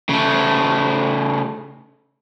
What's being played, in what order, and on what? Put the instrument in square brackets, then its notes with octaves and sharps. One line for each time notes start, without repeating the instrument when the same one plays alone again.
[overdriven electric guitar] C#3 A3